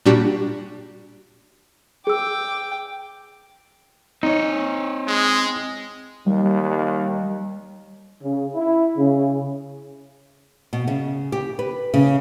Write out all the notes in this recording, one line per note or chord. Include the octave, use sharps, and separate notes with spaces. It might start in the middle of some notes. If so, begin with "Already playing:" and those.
A#2 G3 D4 F#4 G4
G#4 G5 D6 E6
C4 D#4 C#5
G#3
D#2 G3
C#3
E4
C#3
B2
C#3
G4
B4
C#3